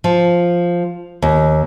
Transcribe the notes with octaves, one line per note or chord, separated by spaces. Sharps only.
F3
D#2